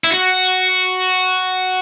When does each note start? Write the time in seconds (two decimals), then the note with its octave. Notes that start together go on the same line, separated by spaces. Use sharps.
0.04 E4
0.11 F#4